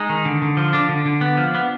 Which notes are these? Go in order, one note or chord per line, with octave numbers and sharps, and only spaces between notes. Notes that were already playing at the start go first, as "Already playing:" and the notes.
Already playing: G#3 D#4
D#3
D3
D3
F3
D3 D4
D3
D3
B3
F3
B3